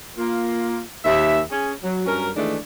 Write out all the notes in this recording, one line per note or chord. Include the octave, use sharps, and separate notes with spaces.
A#3 F4
D#2 E5
C#4 G#4
F#3
G2 F#3 C#4 A#4
D#3 E3 G#3 A3 D4